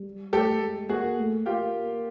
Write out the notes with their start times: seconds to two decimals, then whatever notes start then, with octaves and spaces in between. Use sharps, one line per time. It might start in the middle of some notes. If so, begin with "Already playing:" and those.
Already playing: G3
0.33 A3 G4 A4
0.62 G#3
0.89 A#3 F#4 G#4
1.18 A3
1.46 A#3 F4 G4